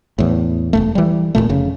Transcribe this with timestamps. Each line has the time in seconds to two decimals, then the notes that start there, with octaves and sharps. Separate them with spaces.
0.19 E2 A2
0.73 E1 E2 A3
0.95 E3 G3
1.35 D#1 F#2 A#2 A3
1.49 F1 C#3